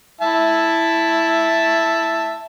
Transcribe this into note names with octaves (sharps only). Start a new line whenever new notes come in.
E4 E5 A5